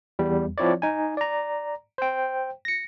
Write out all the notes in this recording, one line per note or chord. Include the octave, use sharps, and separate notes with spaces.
E2 G3
F3 C4 E4 C#5 D5
D#4 G#5
D5 A#5
C5 G5
A#6 C#7